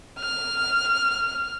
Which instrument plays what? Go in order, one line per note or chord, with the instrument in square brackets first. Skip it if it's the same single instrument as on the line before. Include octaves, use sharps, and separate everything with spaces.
[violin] F6